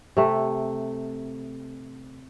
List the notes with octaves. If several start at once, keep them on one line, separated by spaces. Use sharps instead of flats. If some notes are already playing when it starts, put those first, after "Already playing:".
C3 A3